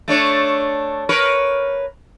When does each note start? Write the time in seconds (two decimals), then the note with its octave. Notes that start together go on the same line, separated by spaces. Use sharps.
0.08 A3 D4 C#5
1.09 A#4 B4 C#5